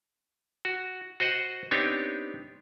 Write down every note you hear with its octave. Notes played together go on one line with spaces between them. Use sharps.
F#4
F#4 C5 D#5 F#5
B3 C4 D4 D#4 G4 C#5